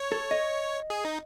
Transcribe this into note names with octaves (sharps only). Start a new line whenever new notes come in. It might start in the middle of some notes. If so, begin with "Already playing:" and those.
Already playing: C#5
A4
D#5
G#4
D#4